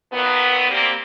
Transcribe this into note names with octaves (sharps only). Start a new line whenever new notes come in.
A#2 D#3 F#3 B3
G3 A#3 C4